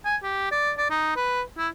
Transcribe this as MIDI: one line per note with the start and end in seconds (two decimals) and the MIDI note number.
0.05 0.16 80
0.23 0.51 67
0.51 0.72 74
0.78 0.86 74
0.90 1.13 63
1.16 1.42 71
1.58 1.68 64